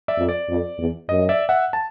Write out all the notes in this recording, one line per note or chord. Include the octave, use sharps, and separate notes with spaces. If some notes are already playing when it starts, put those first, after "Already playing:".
D5 E5
F2
D5
F2
E2
F#2 D#5
D5 E5
E5 F#5
A5